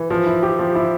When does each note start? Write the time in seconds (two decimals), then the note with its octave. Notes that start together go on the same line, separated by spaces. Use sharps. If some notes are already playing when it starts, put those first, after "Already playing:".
Already playing: E3
0.10 F3
0.26 E4
0.43 G4
0.59 F3
0.75 E4